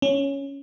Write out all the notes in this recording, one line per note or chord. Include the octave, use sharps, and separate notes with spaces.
C#4